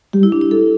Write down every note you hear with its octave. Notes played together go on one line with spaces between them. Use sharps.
G3 G4
E4
D4
E4
A4